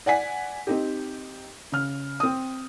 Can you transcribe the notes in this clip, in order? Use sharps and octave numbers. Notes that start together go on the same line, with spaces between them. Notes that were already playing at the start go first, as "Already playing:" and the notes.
D5 F#5 G#5 B6
C4 D#4 G4
C#3 F6
C4 D#6